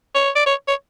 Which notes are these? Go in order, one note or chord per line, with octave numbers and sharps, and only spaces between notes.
C#5
D5
C#5
C#5